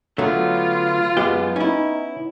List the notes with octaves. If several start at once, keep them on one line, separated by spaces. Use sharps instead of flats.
D3 F#3 A3 B3 F4
F#2 G#3 B3 G4
C#4 D#4 E4